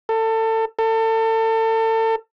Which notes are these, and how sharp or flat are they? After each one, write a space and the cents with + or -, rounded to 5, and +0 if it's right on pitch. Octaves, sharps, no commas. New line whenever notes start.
A4 +25
A4 +30